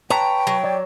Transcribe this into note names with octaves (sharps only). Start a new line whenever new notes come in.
B4 C#5 G5 A5 A#5
F#3
C#5 D5